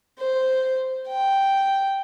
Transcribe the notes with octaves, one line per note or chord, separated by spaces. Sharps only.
C5
G5